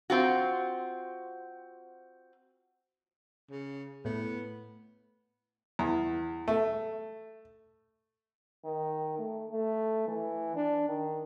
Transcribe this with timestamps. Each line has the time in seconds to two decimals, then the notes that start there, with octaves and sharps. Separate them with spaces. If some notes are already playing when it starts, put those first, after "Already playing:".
0.10 C4 F4 F#4
3.51 C#3
4.05 A2 B3
5.79 E2
6.48 A3
8.65 D#3
9.19 A3
9.51 A3
10.08 E3
10.55 D4
10.88 D#3